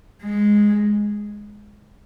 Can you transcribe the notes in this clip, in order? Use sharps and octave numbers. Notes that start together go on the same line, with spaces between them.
G#3